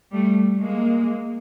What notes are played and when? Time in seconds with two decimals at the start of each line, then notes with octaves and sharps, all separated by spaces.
0.12 G3 A3
0.62 G#3 A#3